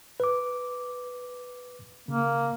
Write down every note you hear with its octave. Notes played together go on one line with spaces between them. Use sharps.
B4 D6
C#3 A#3